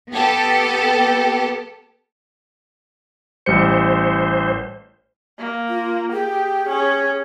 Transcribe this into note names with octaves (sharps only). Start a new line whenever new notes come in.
B3 G4 A4
A1 G3 C5 C#7
A#3
F4
G4 G#4
C#4